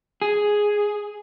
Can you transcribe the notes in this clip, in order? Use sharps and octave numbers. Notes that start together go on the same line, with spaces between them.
G#4